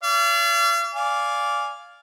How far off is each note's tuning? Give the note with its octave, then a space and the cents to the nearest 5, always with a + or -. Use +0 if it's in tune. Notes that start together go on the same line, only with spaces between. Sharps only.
D5 -40 F5 -40
D5 -15 F5 +0 G#5 +0